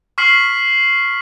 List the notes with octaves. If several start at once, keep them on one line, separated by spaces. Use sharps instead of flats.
C#6 F6 B6 C7 F#7